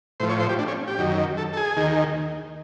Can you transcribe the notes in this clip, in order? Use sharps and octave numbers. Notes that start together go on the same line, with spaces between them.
A2 F3 C5
C#5
C5
G4
D4
C#4
G4
F#2 D#3
A4
A4
G#4
D#2 D#3